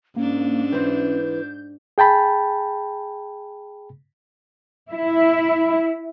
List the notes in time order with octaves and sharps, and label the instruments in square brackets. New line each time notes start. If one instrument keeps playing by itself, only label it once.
[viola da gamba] G#2 D4 [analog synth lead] A#3 [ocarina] C#4
[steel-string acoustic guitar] E3 C4 [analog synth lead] G6
[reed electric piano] G#4 G5 A5 B5
[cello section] E4